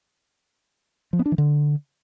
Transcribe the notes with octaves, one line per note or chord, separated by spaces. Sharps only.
F3
B3
D4
E3
D3